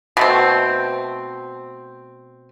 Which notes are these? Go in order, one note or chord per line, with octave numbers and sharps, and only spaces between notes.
B2 A3 C4